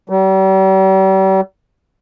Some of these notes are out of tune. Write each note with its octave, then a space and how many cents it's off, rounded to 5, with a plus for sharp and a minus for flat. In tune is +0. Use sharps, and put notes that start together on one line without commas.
G3 -40